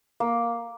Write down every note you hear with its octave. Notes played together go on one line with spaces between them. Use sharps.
A#3